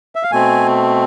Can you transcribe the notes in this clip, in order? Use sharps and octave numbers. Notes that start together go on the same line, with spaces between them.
E5
F5
B2 A3 C4 G#5